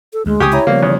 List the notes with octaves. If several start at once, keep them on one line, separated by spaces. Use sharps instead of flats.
A4
D2 G#3
C#2 C3 G4 G#5 C#6 D#6
E4 C#5 A#5
C#3 F3 G3 A#3 B3
E2